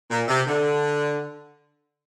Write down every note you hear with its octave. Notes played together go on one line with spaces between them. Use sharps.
A#2
C3
D3